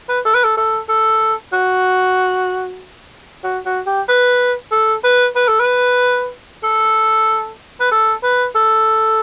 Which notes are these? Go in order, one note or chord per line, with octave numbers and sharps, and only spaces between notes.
B4
A4
B4
A4
A4
A4
F#4
F#4
F#4
G4
B4
A4
B4
B4
A4
B4
A4
B4
A4
B4
A4